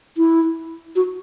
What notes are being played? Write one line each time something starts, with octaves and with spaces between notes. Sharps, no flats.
E4
F#4